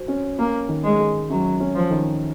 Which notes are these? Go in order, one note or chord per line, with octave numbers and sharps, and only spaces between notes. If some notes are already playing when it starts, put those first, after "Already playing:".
Already playing: F#3 C5
C#4
A#3 C#4
D#3
G#3
G#3
F#2 F#3
C#4
F3
D#3